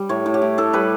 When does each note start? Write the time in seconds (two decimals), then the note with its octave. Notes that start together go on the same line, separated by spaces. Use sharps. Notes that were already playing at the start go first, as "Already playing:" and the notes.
Already playing: G3
0.09 A2 C#5
0.26 A2
0.34 G4
0.42 A2
0.58 A2 A4
0.73 G3 B4